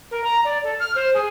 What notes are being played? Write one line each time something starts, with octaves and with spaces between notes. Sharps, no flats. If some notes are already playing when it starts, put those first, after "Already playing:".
A#4
A#5
D5
A4
F6
C5
G#4